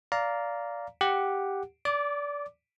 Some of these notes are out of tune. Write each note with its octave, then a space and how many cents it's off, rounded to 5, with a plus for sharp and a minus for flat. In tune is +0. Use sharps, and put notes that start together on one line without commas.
D5 -15 F5 +0 A#5 +0
G4 +0 F#5 +0
D5 -25 D6 +0